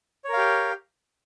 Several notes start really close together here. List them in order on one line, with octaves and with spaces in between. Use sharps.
C#5 A#4 F5 G4